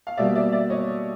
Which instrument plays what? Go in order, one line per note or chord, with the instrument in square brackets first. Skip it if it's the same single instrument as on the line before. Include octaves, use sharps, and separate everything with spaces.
[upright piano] F5
B2 G3 A#3 D5 E5
D5 E5
D5 E5
C#5 D#5